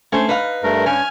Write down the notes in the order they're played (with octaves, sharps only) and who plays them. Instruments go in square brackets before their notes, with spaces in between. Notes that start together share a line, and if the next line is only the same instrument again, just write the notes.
[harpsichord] A3 [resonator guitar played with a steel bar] C#4 C5
[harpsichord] D#4 [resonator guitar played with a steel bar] B4 F5
[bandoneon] G2 A3 A#4
[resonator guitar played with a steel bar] G2 C#4 [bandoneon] G#5 F6